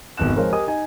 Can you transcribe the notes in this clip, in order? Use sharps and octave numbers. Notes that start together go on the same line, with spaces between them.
G#1 F2 B2 F#6 E7
F3 G#3 A#4 C5 C#5
G4 A#4 D#5 G#5 D#6
D#4 G#5